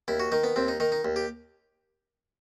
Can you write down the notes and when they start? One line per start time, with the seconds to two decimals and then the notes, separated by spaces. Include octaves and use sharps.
0.08 D#2 E4
0.20 F#4
0.32 D#3 D#4
0.44 B3
0.56 D#2 C4
0.68 D#4
0.80 D#3 D#4
0.92 D#4
1.05 D#2
1.16 G4